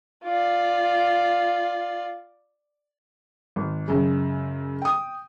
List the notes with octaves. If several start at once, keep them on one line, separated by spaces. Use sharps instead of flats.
F4 D5
G#1
F#2 C#3 G#3
G5 D#6